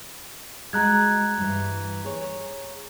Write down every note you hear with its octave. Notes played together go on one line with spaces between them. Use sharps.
G#3 F#4 A#5 F#6 G#6
G2 E3
G#4 C#5